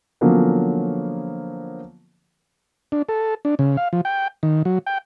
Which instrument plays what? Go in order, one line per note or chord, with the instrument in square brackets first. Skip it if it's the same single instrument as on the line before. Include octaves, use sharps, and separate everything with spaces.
[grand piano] D3 F3 F#3 A#3 B3 C#4
[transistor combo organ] D4
A4
D4
C#3
F5
F3
G5
D#3
F#3
G5